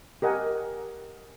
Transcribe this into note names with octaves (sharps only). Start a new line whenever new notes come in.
G4 A#4 D#5 F#5 G#5